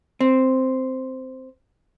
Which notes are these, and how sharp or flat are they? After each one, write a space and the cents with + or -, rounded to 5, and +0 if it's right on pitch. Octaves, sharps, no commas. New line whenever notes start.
C4 -5